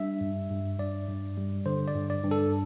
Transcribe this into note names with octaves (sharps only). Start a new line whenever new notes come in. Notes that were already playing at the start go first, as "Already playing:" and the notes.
Already playing: G3 D4 E5
G2
G2
G2 D5
G2
G3
D3 C5
D5
G2
D5
G2
A4